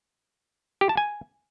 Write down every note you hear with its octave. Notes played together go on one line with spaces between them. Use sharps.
G4
A5
G#5